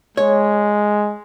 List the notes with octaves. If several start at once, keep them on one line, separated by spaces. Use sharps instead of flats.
G#3 C#5